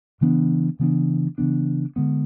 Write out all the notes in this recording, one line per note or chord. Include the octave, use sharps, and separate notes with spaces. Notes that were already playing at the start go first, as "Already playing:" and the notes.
C#3 E3 B3 D4
C#3 E3 B3 D4
C#3 E3 B3 D4
D3 G#3 B3